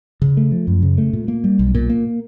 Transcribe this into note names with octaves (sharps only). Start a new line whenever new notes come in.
C#3
A3
F3
F#2
C#3
A3
A#2
A#3
G3
B1
A#2
A#3